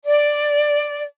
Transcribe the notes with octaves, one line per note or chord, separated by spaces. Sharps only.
D5